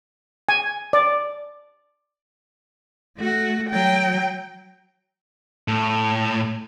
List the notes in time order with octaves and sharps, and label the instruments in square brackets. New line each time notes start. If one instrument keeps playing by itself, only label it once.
[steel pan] G#5
D5
[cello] A3 F#4
F#3 G5
[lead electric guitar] A2